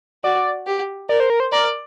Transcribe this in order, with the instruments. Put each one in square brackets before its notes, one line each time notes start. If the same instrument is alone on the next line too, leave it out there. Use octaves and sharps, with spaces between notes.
[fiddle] F#4 [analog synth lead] D5
[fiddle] G4
[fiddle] A#4 [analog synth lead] D5
[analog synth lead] C5
A#4
C5
[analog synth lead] A#4 [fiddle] D5